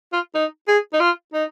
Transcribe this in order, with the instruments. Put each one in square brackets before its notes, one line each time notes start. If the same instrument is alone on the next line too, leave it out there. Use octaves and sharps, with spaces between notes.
[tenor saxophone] F4
D#4
G#4
D#4
F4
D#4